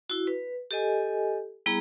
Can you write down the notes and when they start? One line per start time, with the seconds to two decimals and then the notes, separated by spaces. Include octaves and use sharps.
0.10 E4 F#4
0.27 B4
0.71 G4 A4 D#5 G#5
1.66 G3 B3 E4 G#4 A#5